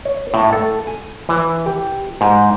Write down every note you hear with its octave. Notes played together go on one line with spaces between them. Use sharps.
C#5
A2
A4
G#5
E3
G4
G#2